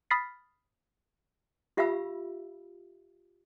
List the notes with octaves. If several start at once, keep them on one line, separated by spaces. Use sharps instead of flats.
B5 D#6 F6 A6 B6 C7
F4 G4 E5 F5 B5 E6